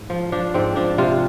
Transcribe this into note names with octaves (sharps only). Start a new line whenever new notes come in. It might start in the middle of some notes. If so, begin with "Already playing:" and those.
Already playing: G#2
F3
F3 D4
G#2 C4
F3 D4
C3 F4